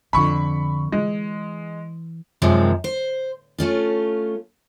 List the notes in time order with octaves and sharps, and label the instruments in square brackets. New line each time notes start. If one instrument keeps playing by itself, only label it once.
[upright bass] F2 D3 [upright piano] B5 C#6
[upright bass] E3 [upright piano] G#3
[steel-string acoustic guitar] F#2 C3 D#3 F3 F#3 G#3
C5
A3 C#4 F4